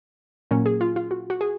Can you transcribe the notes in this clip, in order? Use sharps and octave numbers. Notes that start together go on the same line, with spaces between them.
A#2 F#3 A#3 C#4 A#4
G#4
F4
F4
F#4
F#4
G#4